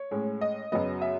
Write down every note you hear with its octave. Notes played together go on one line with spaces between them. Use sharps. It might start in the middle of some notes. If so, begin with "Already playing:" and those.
Already playing: C#5
A2 G#3 C#4
D#5
F#2 C#3 F#3 B3 D#5
E5